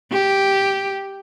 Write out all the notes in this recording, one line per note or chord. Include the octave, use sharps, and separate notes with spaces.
G4